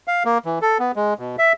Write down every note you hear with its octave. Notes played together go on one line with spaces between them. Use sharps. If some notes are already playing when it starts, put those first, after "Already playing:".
F5
A#3
E3
A4
B3
G#3
B2
E5